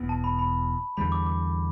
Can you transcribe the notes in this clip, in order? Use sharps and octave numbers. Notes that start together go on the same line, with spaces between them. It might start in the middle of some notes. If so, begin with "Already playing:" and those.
Already playing: E1 E2 B2 B3
A5
B5
B5
E2 D3 G3 B5
D6
D6